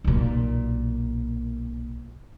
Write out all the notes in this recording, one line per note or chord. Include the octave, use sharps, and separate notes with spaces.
B1 A#2